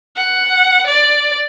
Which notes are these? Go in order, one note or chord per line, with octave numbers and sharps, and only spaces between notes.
F#5
D5